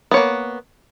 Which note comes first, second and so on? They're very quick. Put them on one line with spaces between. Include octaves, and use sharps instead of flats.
B3 C#5 A#3